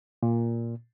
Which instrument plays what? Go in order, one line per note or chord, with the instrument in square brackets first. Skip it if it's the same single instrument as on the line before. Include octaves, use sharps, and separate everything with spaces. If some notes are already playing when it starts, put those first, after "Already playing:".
[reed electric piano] A#2